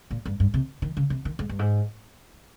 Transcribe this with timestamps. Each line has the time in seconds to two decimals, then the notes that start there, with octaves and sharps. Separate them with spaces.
0.11 A#2
0.25 G2
0.40 G2
0.54 C3
0.82 D#3
0.97 C#3
1.10 C3
1.25 D#3
1.39 G#2
1.49 G2
1.59 G#2